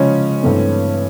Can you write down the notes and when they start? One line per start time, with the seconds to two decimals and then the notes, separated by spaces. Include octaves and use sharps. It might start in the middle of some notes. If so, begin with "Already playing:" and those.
Already playing: C#3 F3 G#3 C#4 C#5
0.43 G2 E3 A3 C4